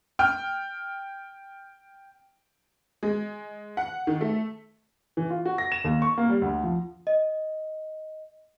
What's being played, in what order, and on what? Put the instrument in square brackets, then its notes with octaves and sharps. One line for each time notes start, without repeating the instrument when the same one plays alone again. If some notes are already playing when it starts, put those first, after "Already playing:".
[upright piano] G5 F6
[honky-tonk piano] G#3
F#5
D#3
A3
[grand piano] E3
F4
F#4
A#6
E7
D#2
C#6
A#3
G3
D2
F3
[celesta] D#5